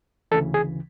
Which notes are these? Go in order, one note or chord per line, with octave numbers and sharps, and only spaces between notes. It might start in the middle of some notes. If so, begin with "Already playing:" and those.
D2 C#3 E3 A4
G#4